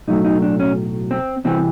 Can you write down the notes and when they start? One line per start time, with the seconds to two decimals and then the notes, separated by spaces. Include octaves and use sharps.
0.08 B1 A2 F#3 A3 D#4
0.25 D#4
0.42 D4
0.60 C#4
1.11 C4
1.44 C2 C3 E3 C4